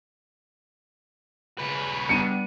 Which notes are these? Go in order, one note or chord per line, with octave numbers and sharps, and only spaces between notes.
C#3 B4
G3 B3 D4 C#7 D#7